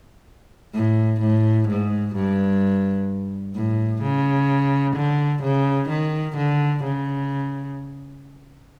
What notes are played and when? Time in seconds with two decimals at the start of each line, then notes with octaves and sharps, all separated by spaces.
0.74 A2
1.21 A2
1.68 G#2
2.15 G2
3.55 A2
4.02 C#3
4.96 D3
5.43 C#3
5.89 D#3
6.36 D3
6.84 C#3